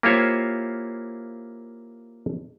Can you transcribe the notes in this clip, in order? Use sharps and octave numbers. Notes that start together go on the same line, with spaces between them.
A#3 E4 F4 G4 C5 C#5